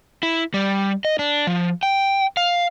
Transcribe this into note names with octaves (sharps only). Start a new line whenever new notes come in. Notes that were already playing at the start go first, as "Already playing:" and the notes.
E4
G3
D#5
D4
F3
G5
F5